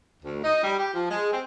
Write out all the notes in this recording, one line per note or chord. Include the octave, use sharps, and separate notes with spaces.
D2
D#4
G3
G4
F3
G#3
C4